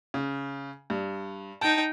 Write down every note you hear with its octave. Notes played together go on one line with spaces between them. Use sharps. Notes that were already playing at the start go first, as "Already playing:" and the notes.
C#3
G2
D#4 G5 A5